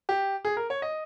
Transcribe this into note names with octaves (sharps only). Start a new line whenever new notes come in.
G4
G#4
A#4
C#5
D#5